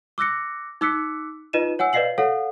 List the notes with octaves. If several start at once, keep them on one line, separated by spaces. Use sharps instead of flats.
D6 E6 F#6 A#6 C#7
D#4 D6 E6 F#6 B6 C#7
D#4 F4 B4 D#5 D#7 E7
C#5 F#5 G#5 E6
B4 D5 D#5 F5 C7 F#7
A4 C#5 F5 F#5